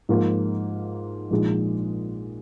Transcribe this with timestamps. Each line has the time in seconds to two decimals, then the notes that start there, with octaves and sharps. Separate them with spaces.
0.09 G#2 F3 A#3 F4
1.31 A#1 A#2 G#3 D#4